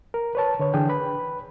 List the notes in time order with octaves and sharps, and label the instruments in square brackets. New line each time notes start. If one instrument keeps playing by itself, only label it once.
[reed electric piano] A#4
B4 C#5 A5
D3 B4 C#5
D3 E3 D4 G#4 G5
B4 B5